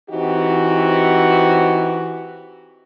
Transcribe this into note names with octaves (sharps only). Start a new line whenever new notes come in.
E3 C4 D#4 F#4 G4